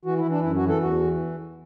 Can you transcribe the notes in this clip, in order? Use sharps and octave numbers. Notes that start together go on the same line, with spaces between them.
E3 F#4
E4
E3
D4
F#2 E4
F#4
E3
A4
E2 F#4
E3